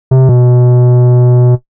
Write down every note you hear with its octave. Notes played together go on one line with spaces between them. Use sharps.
C3
B2